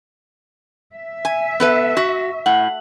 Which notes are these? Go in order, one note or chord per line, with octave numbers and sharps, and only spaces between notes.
E5
G#5
B3 A4 B4
F#4
A2 F#5